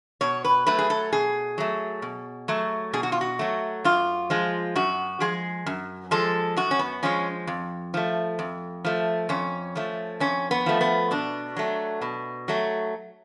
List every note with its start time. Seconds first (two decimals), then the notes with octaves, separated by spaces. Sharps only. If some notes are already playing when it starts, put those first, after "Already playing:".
0.21 B2 C#5
0.44 B4
0.67 F#3 A3 B4
0.79 G#4
0.90 A4
1.12 B2 G#4
1.58 F#3 A3
2.02 B2
2.48 F#3 A3
2.93 B2 G#4
3.03 F#4
3.12 F4
3.21 F#4
3.39 F#3 A3
3.84 F#2 F4
4.30 F3 G#3
4.76 F#2 F#4
5.20 F3 G#3 G#4
5.66 F#2
6.11 F3 G#3 A4
6.57 F#2 F#4
6.71 C#4
6.79 B3
7.03 F3 G#3 C#4
7.47 F2
7.94 F3 A3
8.39 F2
8.85 F3 A3
9.29 F2 C#4
9.75 F3 A3
10.20 F2 C#4
10.51 B3
10.66 F3 A3
10.81 B3
11.11 B2 D4
11.56 F#3 A3
12.02 B2
12.48 F#3 A3